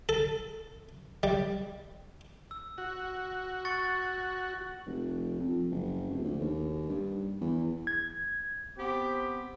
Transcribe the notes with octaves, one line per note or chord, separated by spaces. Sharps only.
A4
G3
E6
F#4
C#6 A6 C#7
F1
F2
F#1
F1
D2
D#2
G2
E2
G#6
B3 C4 G4